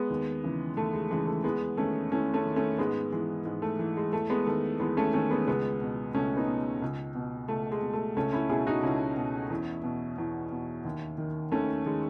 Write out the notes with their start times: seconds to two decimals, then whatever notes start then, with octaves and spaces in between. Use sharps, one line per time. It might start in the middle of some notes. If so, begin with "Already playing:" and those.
Already playing: G#3 B3
0.10 D#2
0.44 C#3 E3
0.77 D#2 A3
0.94 G#3
1.11 C#3 E3 G#3
1.27 A3
1.44 E2 G#3 B3
1.77 D#3 A3 C#4
2.12 E2 A3 C#4
2.34 A3 C#4
2.45 D#3
2.56 A3 C#4
2.78 G#2 G#3 B3
3.12 E3 G#3
3.45 G#2 G#3
3.62 A3
3.79 E3
3.97 G#3
4.13 E2 A3
4.30 G#3 B3
4.47 D#3 A3
4.80 E2 G#3 B3
4.97 A3 C#4
5.13 D#3 A3 C#4
5.31 G#3 B3
5.47 C#2 G#3 B3
5.81 B2
6.14 C#2 A3 C#4
6.37 B3 D#4
6.48 B2
6.82 C#2
7.15 B2
7.48 C#2 A3
7.71 G#3
7.82 B2
7.93 A3
8.16 C#2 A3 C#4
8.33 C#4 E4
8.49 B2 E4 G#4
8.66 D#4 F#4
8.83 C#2 C#4 E4
9.17 B2
9.50 E2
9.84 B2
10.18 E2
10.52 B2
10.85 D#2
11.18 D#3
11.52 D#2 A3 C#4
11.86 D#3 G#3